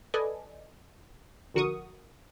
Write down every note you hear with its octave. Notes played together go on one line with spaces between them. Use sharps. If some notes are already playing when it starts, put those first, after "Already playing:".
A4 B4 D5 D#5 G#5
A#1 D3 F#4 A#4 C#6 D#6